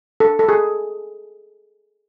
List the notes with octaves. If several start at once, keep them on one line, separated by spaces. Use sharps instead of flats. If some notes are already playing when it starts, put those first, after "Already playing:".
A4
A4
G#4